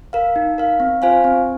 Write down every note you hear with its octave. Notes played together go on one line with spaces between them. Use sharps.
A#4 F5
D#4
A#4 F5
C4
F4 C5 F5 G#5
C4